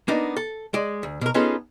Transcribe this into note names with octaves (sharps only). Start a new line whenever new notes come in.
A#3 B3 D4 D#4
A4
G#3 D5
D2
B2 A#4
B3 C#4 D#4 F4 G#4 A4